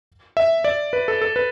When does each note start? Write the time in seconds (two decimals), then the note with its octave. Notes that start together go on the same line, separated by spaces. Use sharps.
0.37 E5
0.64 D5
0.93 B4
1.08 A4
1.22 A4
1.36 B4